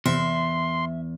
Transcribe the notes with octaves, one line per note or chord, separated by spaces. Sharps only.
E2 C3 E5 C6